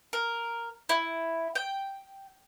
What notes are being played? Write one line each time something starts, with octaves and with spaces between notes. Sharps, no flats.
A#4
E4
G5